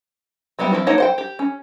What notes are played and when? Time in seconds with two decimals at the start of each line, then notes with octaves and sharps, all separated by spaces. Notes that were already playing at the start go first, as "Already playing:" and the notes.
0.59 F#3 G3 B3 E5 G5
0.71 F3 C4 E4
0.87 A#3 D#4 C#5 F#5 A5
0.98 C5 F#5 G5
1.18 G4
1.39 C#4